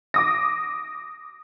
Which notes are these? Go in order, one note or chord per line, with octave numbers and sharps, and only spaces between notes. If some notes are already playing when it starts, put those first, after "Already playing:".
D6 D#6 A#6